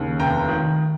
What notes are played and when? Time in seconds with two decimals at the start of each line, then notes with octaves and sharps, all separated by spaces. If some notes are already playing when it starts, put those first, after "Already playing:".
Already playing: D#2 C#3
0.20 F1 G5 A#5
0.48 D#3